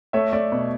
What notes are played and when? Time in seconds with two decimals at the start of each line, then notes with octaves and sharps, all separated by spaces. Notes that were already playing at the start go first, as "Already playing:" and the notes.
0.13 A3 C#5 E5
0.33 A3 D5
0.52 B2